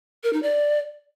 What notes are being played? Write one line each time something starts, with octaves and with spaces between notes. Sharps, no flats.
A#4
D#4
D5